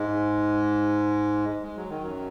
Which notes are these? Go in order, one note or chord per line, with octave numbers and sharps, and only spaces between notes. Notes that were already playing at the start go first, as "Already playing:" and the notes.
Already playing: G#2 G#3
G#3
F#3
D#3
F#2 F#3